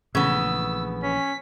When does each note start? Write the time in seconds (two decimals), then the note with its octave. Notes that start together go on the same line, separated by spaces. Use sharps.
0.15 A#1 C#3 E3 A3 B3 E6
1.03 C#4 B6